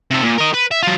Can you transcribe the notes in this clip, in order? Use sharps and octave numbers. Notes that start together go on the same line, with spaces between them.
C3 A4
A#2
A#4 D#5
B4
E5
F#3 F4